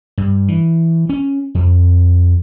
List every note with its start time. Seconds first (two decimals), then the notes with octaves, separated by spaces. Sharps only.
0.18 G2
0.48 E3
1.09 C#4
1.55 F2